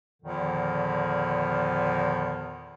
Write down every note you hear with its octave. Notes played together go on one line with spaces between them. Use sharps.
E2 A#2 D3 D#3 F3